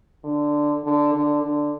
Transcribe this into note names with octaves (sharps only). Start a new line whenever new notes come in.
D3
D3
D3
D3